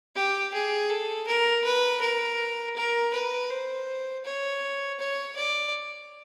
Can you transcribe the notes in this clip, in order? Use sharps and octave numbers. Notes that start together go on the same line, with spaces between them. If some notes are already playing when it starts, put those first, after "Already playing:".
G4
G#4
A4
A#4
B4
A#4
A#4
B4
C5
C#5
C#5
D5